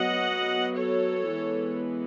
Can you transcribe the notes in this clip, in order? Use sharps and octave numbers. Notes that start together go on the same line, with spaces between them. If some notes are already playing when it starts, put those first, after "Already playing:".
Already playing: F#3 B3 D#5 F#5
A4 C#5
E3 G#3 B3